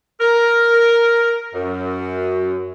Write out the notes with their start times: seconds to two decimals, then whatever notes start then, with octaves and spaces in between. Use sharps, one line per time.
0.21 A#4
1.54 F#2